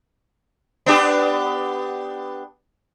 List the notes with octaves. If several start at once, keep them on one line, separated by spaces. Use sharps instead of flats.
B3 D4 G4